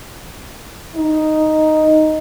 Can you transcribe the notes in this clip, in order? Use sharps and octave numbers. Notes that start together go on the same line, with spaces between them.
D#4